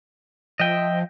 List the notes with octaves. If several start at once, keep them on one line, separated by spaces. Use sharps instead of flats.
F3 D#5 E5 G5